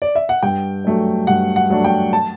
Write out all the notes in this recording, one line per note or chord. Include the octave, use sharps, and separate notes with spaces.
D5
E5
F#5
G2 G5
F#3 A3 D4
G2 F#5
F#5
F#3 A3 D4
G5
A5